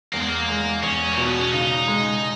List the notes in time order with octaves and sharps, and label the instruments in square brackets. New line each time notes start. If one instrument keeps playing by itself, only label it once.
[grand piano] E2 [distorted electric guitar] A#3
[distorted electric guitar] G#3
A#3
[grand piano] G#3
[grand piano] E2 [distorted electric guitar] C#4
[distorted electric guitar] A#3
[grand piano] B2
[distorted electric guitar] B3
C#4
[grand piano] C#3 [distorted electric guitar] D#4
[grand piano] G#3